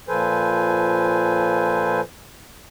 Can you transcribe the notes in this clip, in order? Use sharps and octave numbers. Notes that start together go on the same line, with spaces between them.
A#2 F3 A4 B4 C5 G#5